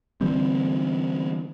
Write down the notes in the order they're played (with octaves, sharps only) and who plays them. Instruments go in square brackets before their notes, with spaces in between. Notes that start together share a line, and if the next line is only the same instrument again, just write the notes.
[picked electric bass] D3 E3 G3 C4